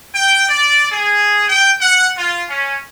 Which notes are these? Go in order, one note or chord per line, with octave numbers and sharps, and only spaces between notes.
G5
D5
G#4
G5
F#5
F4
C#4